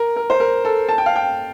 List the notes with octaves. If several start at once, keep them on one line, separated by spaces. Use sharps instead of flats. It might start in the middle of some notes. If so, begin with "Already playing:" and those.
Already playing: A#4
A#4
C5
A#4
A4
A5
G5
F5
G5